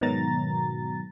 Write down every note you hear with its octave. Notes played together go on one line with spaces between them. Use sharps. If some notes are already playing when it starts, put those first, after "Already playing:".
G#2 B2 D#3 F#3 A#5 A6